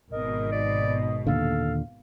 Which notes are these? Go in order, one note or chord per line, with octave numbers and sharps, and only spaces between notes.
G#1 B2 A#4 D#5
D5
D#2 A#2 D3 A4 F5